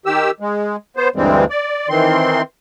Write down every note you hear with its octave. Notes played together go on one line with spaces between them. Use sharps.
D#3 G4 E6
G#3
B3 C5
D2 G2 E3 G3 G#3 C4
D5
D#3 E3 C4 C6